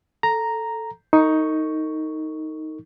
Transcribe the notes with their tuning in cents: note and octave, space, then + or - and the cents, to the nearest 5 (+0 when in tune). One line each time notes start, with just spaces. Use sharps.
A4 +0 A#5 +0
D#4 +10 A#4 -45 C#6 +0